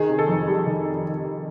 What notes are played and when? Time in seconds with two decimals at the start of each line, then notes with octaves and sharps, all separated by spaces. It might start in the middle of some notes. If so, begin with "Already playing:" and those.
Already playing: D#3 G#4
0.08 C3
0.19 A4
0.28 F2
0.47 G3
0.66 D#3